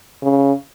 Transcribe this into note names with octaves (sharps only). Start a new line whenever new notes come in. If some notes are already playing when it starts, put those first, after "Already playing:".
C#3